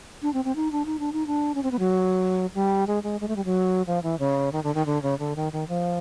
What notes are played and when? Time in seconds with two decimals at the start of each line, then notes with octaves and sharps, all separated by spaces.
0.22 D4
0.34 C4
0.45 C4
0.56 D#4
0.72 D4
0.86 D#4
0.99 D4
1.13 D#4
1.27 D4
1.55 C#4
1.63 C4
1.72 B3
1.79 F#3
2.55 G3
2.87 G#3
3.03 G#3
3.21 G#3
3.28 A3
3.36 G3
3.45 F#3
3.87 F3
4.03 E3
4.19 C#3
4.52 D#3
4.64 D3
4.75 D#3
4.86 D3
5.03 C#3
5.19 D3
5.36 D#3
5.53 D#3
5.68 F3